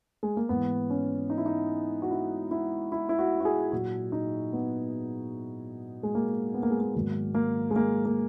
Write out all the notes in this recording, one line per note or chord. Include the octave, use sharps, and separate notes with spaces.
G#3
A#3
G#2 E3 B3
C#4
D#4
E4
D#4
F#4
E4
E4
E4
E4
F#4
F#4
G#4
A#2 F#3 F#4
D#4
B3
G#3
A#3
B3
A#3
G#3
A#3
G#2 D#3 F#3 A#3
A#3
G#3
A#3
A#3